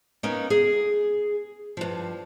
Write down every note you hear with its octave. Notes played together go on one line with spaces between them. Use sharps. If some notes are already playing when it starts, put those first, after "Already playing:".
A#3 B3 C#4 D#4
G#4
G2 F3